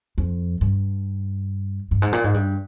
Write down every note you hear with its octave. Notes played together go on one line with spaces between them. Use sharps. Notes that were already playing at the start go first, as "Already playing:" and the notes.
F2
G2
G2
G#2
A#2
G#2
G2